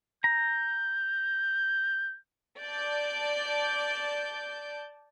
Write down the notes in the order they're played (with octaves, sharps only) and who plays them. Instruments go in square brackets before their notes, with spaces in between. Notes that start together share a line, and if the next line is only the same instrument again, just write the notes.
[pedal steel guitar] A#5 [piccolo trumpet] G6
[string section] D5 A5 G6